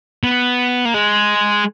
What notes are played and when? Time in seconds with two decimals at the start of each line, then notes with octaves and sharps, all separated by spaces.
0.23 B3
0.85 A#3
0.94 G#3